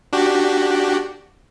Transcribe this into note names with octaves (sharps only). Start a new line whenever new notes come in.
D4 F#4 G4